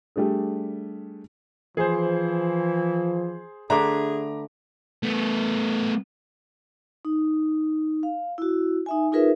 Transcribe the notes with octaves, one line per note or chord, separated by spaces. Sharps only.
G3 A3 D4 G#4
E3 F3 G#4 C5
D3 A3 G#4 B4 A#5 D6
A3 B3
D#4
F5
E4 F#4
D#4 E5 G#5
D#4 F4 G#4 A#4 B4 E5